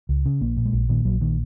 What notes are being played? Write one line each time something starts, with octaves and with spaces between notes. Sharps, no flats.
C#2
C#3
A#1 A#3
A#2
G#3
A#1
A#2 D#3
A#1 F#3
A#2 D#3